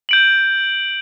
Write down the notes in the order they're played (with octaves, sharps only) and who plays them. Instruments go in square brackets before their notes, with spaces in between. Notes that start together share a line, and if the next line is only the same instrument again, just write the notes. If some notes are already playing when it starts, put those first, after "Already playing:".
[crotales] G6 D7 F#7